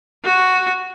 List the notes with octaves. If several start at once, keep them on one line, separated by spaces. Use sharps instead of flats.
F#4